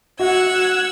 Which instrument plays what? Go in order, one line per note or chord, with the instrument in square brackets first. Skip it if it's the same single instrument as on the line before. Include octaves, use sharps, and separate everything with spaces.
[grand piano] F#4 [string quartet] F#5 E6 G#6